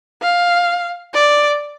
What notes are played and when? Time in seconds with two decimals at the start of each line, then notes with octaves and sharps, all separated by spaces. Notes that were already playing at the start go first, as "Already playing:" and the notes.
0.22 F5
1.14 D5